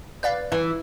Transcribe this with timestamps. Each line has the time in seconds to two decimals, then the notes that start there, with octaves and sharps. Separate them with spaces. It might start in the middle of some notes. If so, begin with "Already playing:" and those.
0.23 B4 D5 F5
0.52 E3